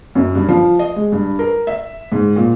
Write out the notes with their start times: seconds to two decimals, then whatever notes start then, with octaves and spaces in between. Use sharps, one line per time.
0.15 F#2
0.35 G2
0.48 F3
0.79 D#5
0.96 G#3
1.12 G2
1.39 A#4
1.67 E5
2.12 G#2
2.36 A#2